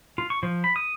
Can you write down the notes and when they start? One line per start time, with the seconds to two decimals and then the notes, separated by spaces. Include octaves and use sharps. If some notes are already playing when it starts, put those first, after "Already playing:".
0.18 F4
0.30 C#6
0.43 F3
0.64 B5
0.76 D#6